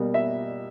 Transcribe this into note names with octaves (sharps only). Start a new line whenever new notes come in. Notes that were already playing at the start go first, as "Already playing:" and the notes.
Already playing: B2 G3 A#3
E5